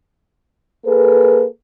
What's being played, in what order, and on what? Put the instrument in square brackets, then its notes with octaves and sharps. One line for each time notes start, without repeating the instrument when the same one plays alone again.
[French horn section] A#3 G#4 A4 B4